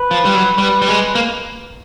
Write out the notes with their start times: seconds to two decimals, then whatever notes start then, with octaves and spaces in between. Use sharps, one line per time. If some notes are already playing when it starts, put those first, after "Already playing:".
Already playing: B4
0.11 F3
0.25 G3
0.34 F#3
0.58 G3
0.82 G3
0.88 G#3
1.15 A#3